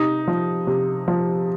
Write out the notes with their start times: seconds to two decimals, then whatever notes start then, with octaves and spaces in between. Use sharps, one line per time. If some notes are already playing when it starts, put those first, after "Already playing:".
Already playing: C3 D#4
0.28 F3
0.67 C3
1.08 F3